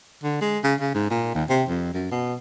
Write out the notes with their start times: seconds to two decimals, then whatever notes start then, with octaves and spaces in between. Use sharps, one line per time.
0.23 D3
0.41 G#3
0.64 C#3
0.80 C#3
0.94 G#2
1.10 A#2
1.35 D#2
1.49 C3
1.69 F2
1.94 F#2
2.11 B2